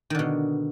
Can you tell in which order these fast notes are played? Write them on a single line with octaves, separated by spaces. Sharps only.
D#3 D3 B2